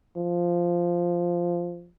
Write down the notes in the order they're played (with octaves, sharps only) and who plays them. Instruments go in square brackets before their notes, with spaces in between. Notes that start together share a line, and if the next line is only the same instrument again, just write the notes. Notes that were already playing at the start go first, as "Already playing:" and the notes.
[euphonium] F3